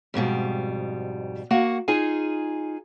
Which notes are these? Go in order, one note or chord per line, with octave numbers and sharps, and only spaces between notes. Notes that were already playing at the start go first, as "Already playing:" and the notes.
F2 G#2 B2 G3
A#3 F#4 F#5
D#4 F4 G#4 G#5